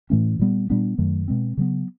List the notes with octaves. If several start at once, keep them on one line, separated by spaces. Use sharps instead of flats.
A2 E3 A3 C#4
A#2 G3 B3
A#2 G3 B3 D4
F#2 D#3 F#3 A3
B2 G#3 C4
C#3 F#3 B3